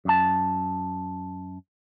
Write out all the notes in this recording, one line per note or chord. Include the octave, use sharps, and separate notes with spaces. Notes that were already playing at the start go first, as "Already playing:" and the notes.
F#2 A5